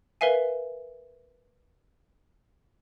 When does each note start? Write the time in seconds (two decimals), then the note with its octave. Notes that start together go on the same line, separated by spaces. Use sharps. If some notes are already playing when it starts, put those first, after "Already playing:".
0.21 A#4 B4 E5 F5 G#5